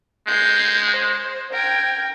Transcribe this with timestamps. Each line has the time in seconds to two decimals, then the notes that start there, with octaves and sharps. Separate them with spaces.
0.28 G#3 G6 C7
0.90 C5
1.53 A#4 G5 G#6